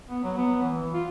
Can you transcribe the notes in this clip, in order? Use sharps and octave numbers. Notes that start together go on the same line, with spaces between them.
B3
F#3
B3
E3
F4